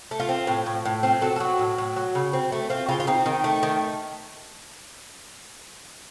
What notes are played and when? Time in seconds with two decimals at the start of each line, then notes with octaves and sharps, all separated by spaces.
0.11 A3
0.20 F4
0.29 C4
0.47 A2
0.66 A2
0.85 A2
1.03 C4 F4
1.21 F#3 A4
1.36 A4
1.40 F#3 F#4
1.59 A2
1.78 A2
1.96 F#3
2.15 C#3
2.33 C4
2.52 A3
2.70 C4 F4
2.89 C#3 F4
3.00 F4
3.07 C4 D#4
3.26 D#3
3.44 A3
3.63 D#3